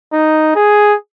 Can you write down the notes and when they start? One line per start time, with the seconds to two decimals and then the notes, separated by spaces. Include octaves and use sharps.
0.13 D#4
0.56 G#4